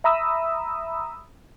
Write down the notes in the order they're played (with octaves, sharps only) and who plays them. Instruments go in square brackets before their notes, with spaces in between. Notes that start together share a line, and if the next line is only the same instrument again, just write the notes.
[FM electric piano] E5 A#5 B5 D#6 E6